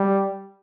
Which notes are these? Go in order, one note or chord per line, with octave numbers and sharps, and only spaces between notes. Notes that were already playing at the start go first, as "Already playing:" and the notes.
Already playing: G3